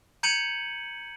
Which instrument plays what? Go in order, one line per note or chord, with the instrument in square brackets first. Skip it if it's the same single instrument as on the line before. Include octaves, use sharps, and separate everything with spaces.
[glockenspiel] A#5 G6 G#6 C#7 D#7 F#7